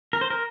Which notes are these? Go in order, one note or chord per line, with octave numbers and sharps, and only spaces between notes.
A#4
C5
A#4